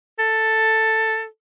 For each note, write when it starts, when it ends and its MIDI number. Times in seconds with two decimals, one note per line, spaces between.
0.19 1.26 69